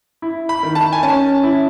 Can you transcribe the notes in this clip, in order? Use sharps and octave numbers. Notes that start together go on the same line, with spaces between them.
E4
B5
D#3
A5
G#5
C#4 A5
E4